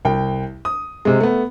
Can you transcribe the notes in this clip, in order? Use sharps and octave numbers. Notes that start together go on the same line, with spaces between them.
C2 G5
D#6
C3 G#3
A3 B3